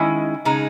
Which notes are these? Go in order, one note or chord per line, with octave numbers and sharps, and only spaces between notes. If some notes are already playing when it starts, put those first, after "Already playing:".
Already playing: D#3 G#3 C#4 E4
C#3 G#3 D#4